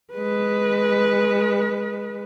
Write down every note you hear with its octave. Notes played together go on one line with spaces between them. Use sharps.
G#3 B4